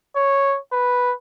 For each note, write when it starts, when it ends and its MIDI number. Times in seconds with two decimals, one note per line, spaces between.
0.16 0.58 73
0.73 1.13 71